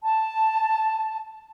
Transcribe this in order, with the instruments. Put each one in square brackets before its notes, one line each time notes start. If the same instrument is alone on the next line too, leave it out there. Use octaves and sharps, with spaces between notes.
[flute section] A5